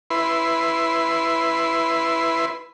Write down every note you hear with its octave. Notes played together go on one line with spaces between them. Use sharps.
E4 B4 C6